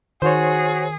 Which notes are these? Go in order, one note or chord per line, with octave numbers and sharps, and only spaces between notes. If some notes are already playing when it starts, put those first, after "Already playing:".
D#3 F#4 G#4 C5 C#5